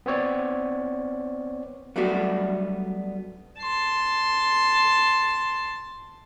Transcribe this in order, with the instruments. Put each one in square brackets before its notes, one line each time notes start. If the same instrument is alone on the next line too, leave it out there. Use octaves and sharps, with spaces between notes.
[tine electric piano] B3 C4 C#5 D5
[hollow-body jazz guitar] F#3 G3 A3 B3 D4 F#4
[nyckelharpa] A5 C6